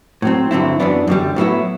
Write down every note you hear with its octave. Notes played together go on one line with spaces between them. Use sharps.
A2 F#3 C4
G2 D3 F#3 C4 E4
F#2 E3 B3 D4
F#2 D3 G3
A2 F#3 B3 E4